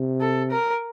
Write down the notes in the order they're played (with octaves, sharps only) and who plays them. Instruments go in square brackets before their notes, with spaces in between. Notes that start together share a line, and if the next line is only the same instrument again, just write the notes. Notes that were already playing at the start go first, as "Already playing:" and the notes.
Already playing: [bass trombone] C3
[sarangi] A4
A#4